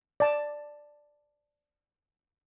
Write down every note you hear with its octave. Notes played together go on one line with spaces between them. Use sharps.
D5 A5